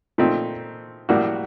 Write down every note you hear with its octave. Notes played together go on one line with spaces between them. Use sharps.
A#2 A3 C4 D#4
A2 G3 A#3 F#4